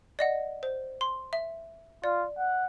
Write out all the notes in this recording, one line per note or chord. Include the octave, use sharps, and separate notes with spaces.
D5 D#5 F#5
C5
C6
E5
F4 D5
F#5